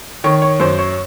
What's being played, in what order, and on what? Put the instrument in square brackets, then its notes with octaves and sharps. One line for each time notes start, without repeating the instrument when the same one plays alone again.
[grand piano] D#3 C#5
C#5
F#2 C5
C#5